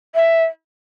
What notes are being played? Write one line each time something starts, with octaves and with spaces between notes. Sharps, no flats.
E5